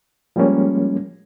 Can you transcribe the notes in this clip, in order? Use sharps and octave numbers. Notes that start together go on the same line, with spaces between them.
F3 G3 G#3 A#3 C#4